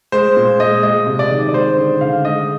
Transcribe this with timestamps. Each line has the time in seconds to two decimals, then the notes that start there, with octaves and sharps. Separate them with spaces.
0.12 G#3 C5
0.37 A#2
0.60 G#3 D#5
0.83 G#3 D#5
1.07 C3
1.19 D5
1.31 D#3
1.49 D5
1.54 G#3 C5
1.78 D3
2.01 D3 F5
2.25 G#3 D#5